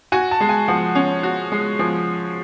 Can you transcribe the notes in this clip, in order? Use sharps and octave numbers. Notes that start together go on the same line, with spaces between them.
F#4 G#5
A5
G#3
G#5
F3 F#5
C#4
F#4
G#3
F3 G#5